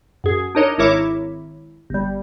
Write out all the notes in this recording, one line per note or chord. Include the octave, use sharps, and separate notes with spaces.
F#2 G#4
D4 D#4 A#4 C#5 D#5
G#1 E4 A#4 C#5 E5 D6
G1 G3